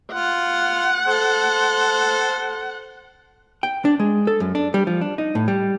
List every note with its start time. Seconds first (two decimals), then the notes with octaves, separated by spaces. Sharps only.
0.13 F4 F#5
1.08 A4 C5
3.63 G5
3.85 D4
4.00 G#3
4.27 A4
4.40 F#2
4.55 D4
4.74 G3
4.87 F3
5.01 D4
5.18 D#4
5.35 A2
5.48 G3